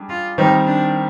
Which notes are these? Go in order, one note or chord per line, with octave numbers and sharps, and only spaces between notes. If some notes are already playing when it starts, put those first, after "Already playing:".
Already playing: G3 D4 G#4 D5
F4
D#3 G3 C4 D#4 G4
D4